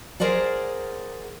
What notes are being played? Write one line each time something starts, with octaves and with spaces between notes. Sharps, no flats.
G#4 A#4 C5 D5 F#5